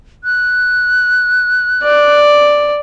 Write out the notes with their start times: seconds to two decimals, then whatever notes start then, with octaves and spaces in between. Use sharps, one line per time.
0.24 F#6
1.84 D5